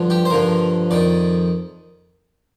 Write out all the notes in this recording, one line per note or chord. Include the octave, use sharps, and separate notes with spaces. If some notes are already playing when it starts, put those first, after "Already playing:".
Already playing: G2 D3 F3
G4
C5
G2 D3 F3 A#4
F2 D#3 D5